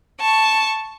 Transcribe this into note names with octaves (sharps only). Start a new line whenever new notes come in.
A5 C#6